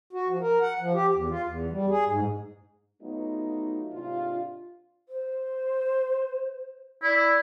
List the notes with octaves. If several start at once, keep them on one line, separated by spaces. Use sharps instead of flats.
F#4
F3
A#4
F#5
F3
G4
E2
F4
E2
G3
G#4
G#2
F#3 A3 B3 D#4 F4
G#2 C3 D4 F4
C5
E4 D5